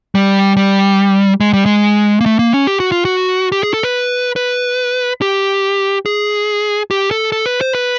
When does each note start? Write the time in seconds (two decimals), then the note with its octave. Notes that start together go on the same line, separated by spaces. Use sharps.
0.15 G3
0.57 G3
1.40 G#3
1.53 G3
1.66 G#3
2.21 A#3
2.26 A3
2.39 A#3
2.53 C#4
2.67 G4
2.80 F#4
2.92 F4
3.05 F#4
3.52 G4
3.63 G#4
3.74 A4
3.83 B4
4.36 B4
5.22 G4
6.06 G#4
6.91 G4
7.11 A4
7.32 A4
7.46 B4
7.61 C5
7.75 B4